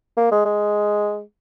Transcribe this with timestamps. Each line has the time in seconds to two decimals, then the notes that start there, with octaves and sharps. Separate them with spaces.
0.17 A#3
0.32 G#3
0.45 G#3